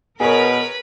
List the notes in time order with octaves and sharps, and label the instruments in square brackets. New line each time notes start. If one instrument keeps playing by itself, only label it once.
[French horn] B2 [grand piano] G#4 C#5 [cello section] A#4 [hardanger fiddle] B4 B5